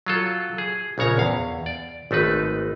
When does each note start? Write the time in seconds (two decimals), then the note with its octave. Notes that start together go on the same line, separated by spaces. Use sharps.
0.06 F#3 F4 A4
0.58 G#4
0.98 A#1 C#3 C#5 A#5
1.18 E2 F5
1.66 D5
2.11 G#1 A3 D#4 B4